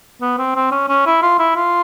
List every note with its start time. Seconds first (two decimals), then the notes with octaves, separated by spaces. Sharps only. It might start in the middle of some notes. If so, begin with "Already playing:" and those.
0.21 B3
0.38 C4
0.55 C4
0.71 C#4
0.89 C#4
1.06 E4
1.22 F4
1.39 E4
1.56 F4